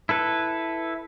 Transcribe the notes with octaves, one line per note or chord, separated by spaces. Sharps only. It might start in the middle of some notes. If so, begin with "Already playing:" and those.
E4 A4 B4